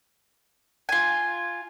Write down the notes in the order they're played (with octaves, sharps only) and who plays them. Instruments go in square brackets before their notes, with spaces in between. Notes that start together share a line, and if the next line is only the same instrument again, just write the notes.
[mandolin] F4 G#5